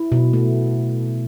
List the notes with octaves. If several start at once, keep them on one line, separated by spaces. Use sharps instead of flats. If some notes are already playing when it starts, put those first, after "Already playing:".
Already playing: E4
B2
A3